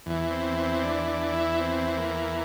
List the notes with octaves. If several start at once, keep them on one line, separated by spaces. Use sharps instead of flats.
E2 E3
C4
C4
D4
D4
E4
C4
C4
A#3